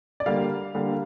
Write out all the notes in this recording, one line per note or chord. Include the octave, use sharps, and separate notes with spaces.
D5
D3 G3 A#3 F5
D3 G3 A#3